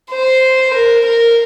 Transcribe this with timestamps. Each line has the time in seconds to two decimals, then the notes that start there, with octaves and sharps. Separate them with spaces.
0.12 C5
0.74 A#4
1.06 A#4